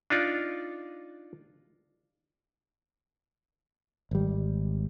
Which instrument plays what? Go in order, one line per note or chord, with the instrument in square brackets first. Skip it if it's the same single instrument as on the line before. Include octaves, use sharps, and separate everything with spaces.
[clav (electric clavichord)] D4 D#4 F4 D5
[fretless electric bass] G#1 G3